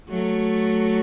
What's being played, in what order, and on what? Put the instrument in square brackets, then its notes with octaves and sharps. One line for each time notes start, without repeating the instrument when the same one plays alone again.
[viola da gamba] F#3 A3